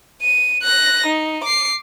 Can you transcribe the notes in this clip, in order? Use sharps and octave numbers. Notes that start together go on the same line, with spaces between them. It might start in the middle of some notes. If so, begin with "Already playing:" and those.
D#7
F#6 A#6
D#4
D6 C7